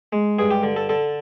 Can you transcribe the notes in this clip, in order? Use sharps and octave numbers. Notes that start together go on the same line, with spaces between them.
G#3
G2 G#4
G4
D3
A4
D3 A4